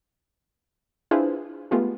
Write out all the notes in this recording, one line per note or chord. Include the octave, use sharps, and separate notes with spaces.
D4 E4 F4 G#4 B4 C5
G#3 A3 B3 F4 G4